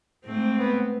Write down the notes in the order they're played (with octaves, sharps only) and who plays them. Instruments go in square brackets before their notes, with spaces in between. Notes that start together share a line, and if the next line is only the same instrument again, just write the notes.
[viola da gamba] G#2 A3 C4
[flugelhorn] B3